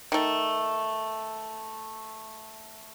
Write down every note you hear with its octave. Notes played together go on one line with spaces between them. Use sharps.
D#3 A3